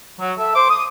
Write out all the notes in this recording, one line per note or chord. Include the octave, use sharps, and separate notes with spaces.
F#3
A4 E5
C5 D6
D#6